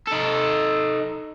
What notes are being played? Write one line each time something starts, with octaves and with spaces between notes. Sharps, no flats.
D#4 A4